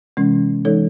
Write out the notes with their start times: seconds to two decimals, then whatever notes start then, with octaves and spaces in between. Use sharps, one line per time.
0.17 C3 E3 G#3 C#4
0.65 E3 G#3 D#4 A4 C#5